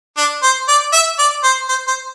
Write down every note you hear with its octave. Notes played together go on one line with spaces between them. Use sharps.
D4
C5
D5
E5
D5
C5
C5
C5